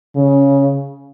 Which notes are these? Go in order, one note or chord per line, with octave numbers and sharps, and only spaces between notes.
C#3